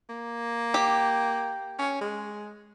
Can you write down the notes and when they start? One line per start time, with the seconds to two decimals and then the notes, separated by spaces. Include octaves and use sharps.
0.09 A#3
0.74 G4
1.79 C#4
2.01 G#3